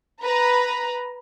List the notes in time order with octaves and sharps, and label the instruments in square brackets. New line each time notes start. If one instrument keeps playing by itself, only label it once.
[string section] B4 A#5